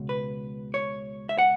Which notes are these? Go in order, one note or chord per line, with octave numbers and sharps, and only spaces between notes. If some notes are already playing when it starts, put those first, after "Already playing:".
Already playing: C#2 B2
B4
C#5
E5
F#5